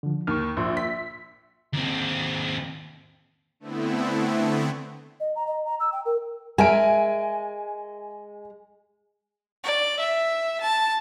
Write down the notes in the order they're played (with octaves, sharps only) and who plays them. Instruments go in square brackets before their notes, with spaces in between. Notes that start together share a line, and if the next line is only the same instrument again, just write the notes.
[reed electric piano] D3 F3
[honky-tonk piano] D#2 [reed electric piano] C#6 F6
[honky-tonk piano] A#1 [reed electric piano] E5 C6 E6
[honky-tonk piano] B6
[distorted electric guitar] D#2 C4
[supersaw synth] D3 A3 B3 C4 E4
[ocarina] D#5
A#5
D#5
A#5
E6
G5
A#4
[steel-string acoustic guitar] G#3 [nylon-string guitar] A#4 E5 [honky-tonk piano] G#5 D7
[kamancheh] D5
E5
A5